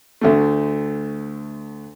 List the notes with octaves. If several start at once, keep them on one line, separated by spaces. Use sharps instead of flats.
D2 D3 A3